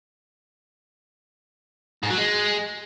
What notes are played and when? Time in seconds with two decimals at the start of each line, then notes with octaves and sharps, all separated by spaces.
2.03 G#2
2.10 F#3
2.18 G#3